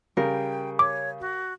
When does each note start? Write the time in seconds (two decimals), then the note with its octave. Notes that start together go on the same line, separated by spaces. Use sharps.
0.17 C#3 G3 A#4 G5
0.79 C#5 D6
1.20 F#4